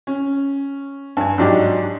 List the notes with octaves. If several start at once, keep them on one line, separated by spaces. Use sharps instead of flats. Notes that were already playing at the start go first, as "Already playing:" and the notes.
C#4
G2 G#5
G#2 F#3 D4 D#4 G4